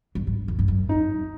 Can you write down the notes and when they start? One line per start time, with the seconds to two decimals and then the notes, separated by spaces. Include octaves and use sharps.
0.15 G2
0.27 G#2
0.48 F2
0.59 G2
0.68 F#2
0.89 D#4